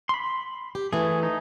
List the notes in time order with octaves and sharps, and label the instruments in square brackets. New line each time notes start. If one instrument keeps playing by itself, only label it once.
[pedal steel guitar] B5 C6
[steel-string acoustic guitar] G4
[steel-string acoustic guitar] E3 A3 [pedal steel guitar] G#4
[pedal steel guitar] D#4